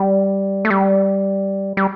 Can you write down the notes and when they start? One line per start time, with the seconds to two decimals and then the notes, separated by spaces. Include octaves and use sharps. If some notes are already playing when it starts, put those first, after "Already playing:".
Already playing: G3
0.65 A3
0.70 G3
1.77 G3